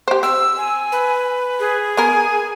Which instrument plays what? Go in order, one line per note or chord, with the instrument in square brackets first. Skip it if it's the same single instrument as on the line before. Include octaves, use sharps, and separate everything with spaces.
[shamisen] G4 C5
[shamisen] C4 [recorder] E6
[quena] G#5
[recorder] B4
[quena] G#4
[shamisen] B3 A#4 [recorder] G#5